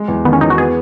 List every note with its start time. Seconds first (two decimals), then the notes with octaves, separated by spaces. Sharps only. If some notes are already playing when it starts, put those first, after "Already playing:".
Already playing: G#3
0.08 E2
0.25 D#3 B3
0.33 C#4
0.41 E2 D#4
0.50 F#4
0.58 B3 G#4